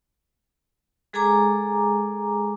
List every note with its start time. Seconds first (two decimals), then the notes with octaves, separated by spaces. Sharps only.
1.13 G#3 G#4 A4 G#5 A#5 D6